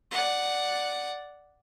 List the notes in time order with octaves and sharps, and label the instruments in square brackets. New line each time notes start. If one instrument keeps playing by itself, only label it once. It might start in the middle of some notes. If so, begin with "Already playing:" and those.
[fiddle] D5 F#5